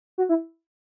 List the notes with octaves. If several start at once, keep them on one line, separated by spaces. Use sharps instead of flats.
F#4
E4